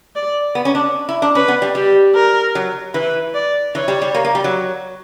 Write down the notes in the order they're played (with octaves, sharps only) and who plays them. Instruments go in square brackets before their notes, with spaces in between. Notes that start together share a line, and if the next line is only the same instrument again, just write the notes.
[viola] D5
[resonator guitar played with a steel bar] B3
C#4
D4
E4
D4
[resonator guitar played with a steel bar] C#4 [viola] B4
[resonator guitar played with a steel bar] B3
G3
[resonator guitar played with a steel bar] G3 [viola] G4
[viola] A#4
[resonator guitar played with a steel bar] F#3
[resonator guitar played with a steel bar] E3 [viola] B4
[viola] D5
[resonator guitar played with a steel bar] E3 [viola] C#5
[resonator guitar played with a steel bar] G3
G3
A#3
A#3
G3
F#3